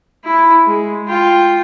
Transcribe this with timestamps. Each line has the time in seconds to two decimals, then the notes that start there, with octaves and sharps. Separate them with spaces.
0.24 E4
0.67 G#3
1.07 F4 G5